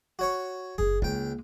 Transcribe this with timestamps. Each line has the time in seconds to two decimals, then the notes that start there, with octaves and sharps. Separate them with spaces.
0.19 F#4 C#5 C#6
0.78 F#1 G#4
1.02 C#2 G#3 A#3 G5